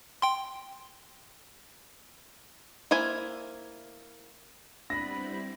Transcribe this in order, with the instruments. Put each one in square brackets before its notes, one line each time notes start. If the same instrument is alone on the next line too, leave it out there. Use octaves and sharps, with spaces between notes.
[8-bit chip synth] G5 C6
[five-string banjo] A#3 E4 C5 G#5
[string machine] G3 C4 E4 [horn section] B3 B5 [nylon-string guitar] D4 [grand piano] A#6